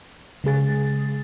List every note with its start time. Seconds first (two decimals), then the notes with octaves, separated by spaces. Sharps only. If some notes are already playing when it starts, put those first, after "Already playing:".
0.44 C#3 G#3 G#4 A6